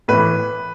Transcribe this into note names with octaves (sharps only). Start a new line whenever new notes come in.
A2 E3 B4